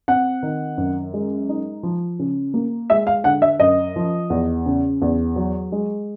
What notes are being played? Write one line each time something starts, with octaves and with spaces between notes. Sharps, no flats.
C4 F#5
D#3
F#2
G#3
D#4
F3
C#3
A#3
G#3 E5
F5
D3 F#5
E5
F#2 D#5
F3
E2
C#3
E2
F#3
G#3